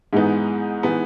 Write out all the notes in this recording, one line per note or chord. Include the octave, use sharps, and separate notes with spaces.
G#2 E3 G#3 B3 D#4
E3 G#3 B3 D#4